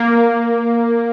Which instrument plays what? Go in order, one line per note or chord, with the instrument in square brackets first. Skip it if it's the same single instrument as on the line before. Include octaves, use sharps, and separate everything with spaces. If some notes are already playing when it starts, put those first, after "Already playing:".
Already playing: [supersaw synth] A#3